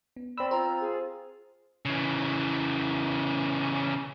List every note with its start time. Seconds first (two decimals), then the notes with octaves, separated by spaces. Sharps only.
0.16 B3
0.38 C4 D5 B5 E6
0.51 F4 C5 A#5
0.81 G#4
1.85 C#3 E3